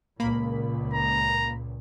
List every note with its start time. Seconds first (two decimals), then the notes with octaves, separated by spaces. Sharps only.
0.20 C#2 A#2 A#3 B5
0.93 A#5